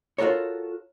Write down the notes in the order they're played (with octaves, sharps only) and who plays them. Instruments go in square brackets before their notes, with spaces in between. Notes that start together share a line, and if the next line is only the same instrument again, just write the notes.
[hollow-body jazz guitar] F4 F#4 A4 A#4 C#5